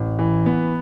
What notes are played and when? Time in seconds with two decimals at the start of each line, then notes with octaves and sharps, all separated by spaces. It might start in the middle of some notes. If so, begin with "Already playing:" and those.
Already playing: A1
0.19 E3
0.46 B3